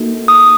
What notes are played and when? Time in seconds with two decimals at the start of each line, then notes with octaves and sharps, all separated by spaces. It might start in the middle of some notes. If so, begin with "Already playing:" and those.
Already playing: A#3 D#4 F#4 A4
0.28 D#6